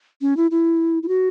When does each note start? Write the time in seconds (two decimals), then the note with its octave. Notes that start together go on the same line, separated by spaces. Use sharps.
0.21 C#4
0.37 E4
0.51 E4
1.03 E4
1.08 F#4